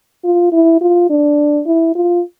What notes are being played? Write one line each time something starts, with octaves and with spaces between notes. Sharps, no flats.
F4
E4
F4
D4
E4
F4